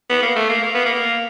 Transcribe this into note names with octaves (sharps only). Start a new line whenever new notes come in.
B3
A#3
A3
A#3
A#3
B3
A#3